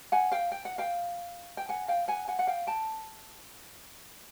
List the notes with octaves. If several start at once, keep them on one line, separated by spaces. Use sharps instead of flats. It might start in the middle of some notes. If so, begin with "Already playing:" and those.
F#5 G#5
F5 G5
G5
F#5
F5 G5
G5
F#5 G#5
F5 G5
F#5 G#5
F#5 G#5
F#5
F5 G5
G5 A5